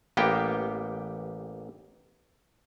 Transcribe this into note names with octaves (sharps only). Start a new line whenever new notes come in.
A1 A#3 B3 G4 G5